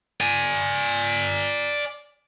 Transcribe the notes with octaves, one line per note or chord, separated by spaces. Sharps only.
D5 G#5